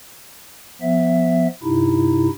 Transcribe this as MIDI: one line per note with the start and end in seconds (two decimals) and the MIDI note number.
0.81 1.47 53
0.81 1.47 59
0.81 1.47 76
1.64 2.29 43
1.64 2.29 48
1.64 2.29 63
1.64 2.29 64